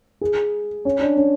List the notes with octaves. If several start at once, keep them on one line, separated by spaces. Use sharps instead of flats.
G#4
C#4
D4
C#4